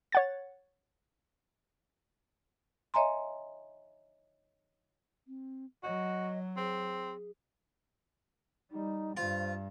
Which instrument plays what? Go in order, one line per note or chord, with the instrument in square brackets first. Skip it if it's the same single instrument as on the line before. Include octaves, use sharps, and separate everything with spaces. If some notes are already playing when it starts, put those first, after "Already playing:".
[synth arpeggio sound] C#5 F#5 A6
[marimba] C#5 D#5 E5 G#5 A#5 C6
[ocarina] C4
[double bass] F#3 [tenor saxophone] F#4 [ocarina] D#5
[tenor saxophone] C4 [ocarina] G#4
[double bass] G3 [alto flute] D#4
[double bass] G2 [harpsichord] F4 [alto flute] C5